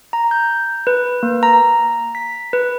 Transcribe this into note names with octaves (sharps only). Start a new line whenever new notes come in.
A#5
G6
B4
A#3
A#5
B6
B4